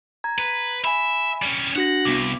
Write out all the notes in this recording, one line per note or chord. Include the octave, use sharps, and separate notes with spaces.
A#5 G#6
B4
E5 G#5 B5
G3 C#4
D4 F#4 F#5 A#6
C2 B3 D6